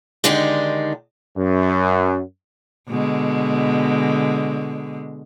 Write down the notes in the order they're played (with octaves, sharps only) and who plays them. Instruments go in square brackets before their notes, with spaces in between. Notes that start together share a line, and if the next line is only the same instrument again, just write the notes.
[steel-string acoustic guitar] D3 D#3 G#3 D4 D#4 G4
[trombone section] F#2
[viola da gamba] B2 D3 G#3